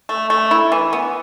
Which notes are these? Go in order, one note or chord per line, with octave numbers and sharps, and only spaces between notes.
A3
A3
E4
E3
B3